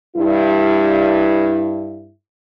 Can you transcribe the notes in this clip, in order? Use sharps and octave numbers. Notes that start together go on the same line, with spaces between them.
G2 E4